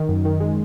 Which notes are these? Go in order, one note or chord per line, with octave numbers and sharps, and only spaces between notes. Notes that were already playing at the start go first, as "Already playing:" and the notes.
Already playing: D#3
F#2
D#3
G#3